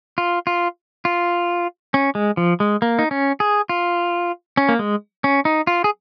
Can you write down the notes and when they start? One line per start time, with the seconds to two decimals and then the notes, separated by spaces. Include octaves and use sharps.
0.18 F4
0.47 F4
1.05 F4
1.94 C#4
2.15 G#3
2.37 F3
2.60 G#3
2.82 A#3
2.99 D#4
3.11 C#4
3.40 G#4
3.69 F4
4.57 C#4
4.69 A#3
4.79 G#3
5.24 C#4
5.45 D#4
5.67 F4
5.84 G#4